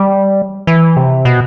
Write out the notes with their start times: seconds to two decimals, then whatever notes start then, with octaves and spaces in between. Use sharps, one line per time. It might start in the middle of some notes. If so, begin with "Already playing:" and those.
Already playing: G3
0.67 E3
0.97 C3
1.25 B2